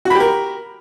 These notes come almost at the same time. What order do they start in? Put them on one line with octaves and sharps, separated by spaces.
F#4 B5 G4 A#4